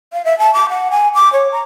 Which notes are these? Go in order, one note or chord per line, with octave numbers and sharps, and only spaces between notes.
F5
E5
A5
D6
F#5
G#5
D6
C#5
A#5